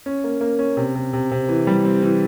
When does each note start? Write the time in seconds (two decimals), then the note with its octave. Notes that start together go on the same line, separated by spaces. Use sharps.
0.06 C#4
0.24 A#3
0.41 A#3
0.59 C#4
0.77 C3
0.95 C3
1.13 C3
1.31 C3
1.49 E3
1.67 G3
1.85 C4
2.03 E3